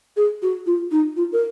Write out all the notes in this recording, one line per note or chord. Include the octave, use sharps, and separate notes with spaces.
G#4
F#4
F4
D#4
F4
A#4